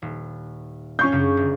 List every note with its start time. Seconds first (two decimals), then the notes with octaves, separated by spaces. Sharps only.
0.02 D#1
0.99 G3 C#4 D4 F4 C#6 G6
1.12 F#2 C#3
1.37 G1